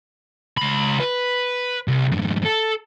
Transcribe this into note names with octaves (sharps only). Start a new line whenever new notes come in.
C#2 B5
B4
C2
F2 G#2
A4